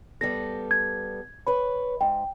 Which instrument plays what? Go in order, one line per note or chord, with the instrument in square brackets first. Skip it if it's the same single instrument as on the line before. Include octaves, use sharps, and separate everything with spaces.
[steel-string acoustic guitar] G3 B3 A4 [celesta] A#6
[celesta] G#6
[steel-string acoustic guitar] B4 C#5 [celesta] B5
[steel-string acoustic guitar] G#2 [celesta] G5